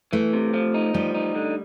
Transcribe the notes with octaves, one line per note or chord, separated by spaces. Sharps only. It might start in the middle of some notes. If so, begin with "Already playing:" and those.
E3 A3
C3
F3
D#4
F3 G3
D#4
D3